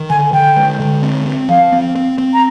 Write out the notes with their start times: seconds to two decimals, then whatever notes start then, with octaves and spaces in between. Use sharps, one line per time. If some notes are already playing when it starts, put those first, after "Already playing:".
Already playing: D#3
0.10 D3 G#5
0.33 D3 G5
0.56 G#3
0.80 D3
1.02 C4
1.26 C4
1.49 F3 F5
1.72 C4
1.96 C4
2.18 C4
2.33 A#5